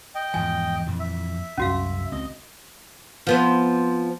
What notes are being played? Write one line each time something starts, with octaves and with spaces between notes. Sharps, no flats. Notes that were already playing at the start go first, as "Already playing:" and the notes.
D#5 G5
E2 G#2 F3 G#5
F2 A#2 E3
E5
C2 F#2 C#4 F#4 F5
C#2 C4 D#5
F3 B3 C4